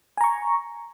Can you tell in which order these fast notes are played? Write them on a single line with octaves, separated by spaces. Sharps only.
G#5 A#5 C#6